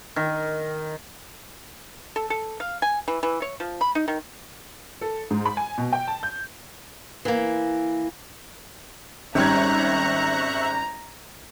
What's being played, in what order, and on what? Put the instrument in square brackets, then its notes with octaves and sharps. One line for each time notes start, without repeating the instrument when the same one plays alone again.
[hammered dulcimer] D#3
[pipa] A4
A4
F5
G#5
E3
E3
C#5
F3
B5
D#4
D#3
[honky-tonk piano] A4
G#2
B5
G#5
B2
G5
A5
G6
[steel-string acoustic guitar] E3 A#3
[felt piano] G#1 G3 G#6 [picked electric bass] C#4 [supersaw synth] E5 C#6 F#6 [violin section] A#5